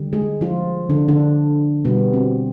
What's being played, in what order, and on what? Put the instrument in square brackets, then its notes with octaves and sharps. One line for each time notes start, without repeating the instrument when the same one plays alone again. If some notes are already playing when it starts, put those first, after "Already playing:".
Already playing: [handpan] D3 G3
G#3 G#4
F3 F4
D3 D4
D3 D4
B2 G3 B3
C4